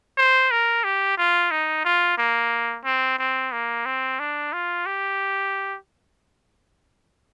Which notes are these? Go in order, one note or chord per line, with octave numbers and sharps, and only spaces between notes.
C5
A#4
G4
F4
D#4
F4
A#3
C4
C4
A#3
C4
D4
F4
G4